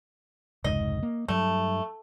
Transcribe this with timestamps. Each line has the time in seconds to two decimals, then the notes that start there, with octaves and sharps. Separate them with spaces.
0.64 F1 C#2 G#2 D#5
1.03 A#3
1.28 G2 F#3 A3